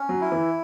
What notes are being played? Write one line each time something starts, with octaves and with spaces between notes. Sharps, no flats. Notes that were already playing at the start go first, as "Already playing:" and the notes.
Already playing: C#4
F#3
E4
E3